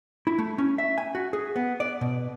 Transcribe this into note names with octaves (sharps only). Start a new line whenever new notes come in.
E4
A3
C#4
E5
G#5
F#4
G#4
B3
D5
B2